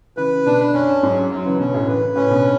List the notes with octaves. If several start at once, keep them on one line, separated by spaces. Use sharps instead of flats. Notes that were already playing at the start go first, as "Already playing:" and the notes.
C#3 E3 B4
B2 D3 D4
F#2 C#4
G#2 F#3
F#2 F#3
C#3 E3
B2 D3 C#4
F#2 A2
C#3 E3 B4
A2 C#3 C#4
B2 D3